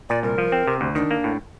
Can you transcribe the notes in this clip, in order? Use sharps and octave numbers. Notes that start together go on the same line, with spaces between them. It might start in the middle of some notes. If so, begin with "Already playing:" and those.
A#2 D5
C2 A#4
F3
C4
C3
D2
D#3 D4
A#3
A2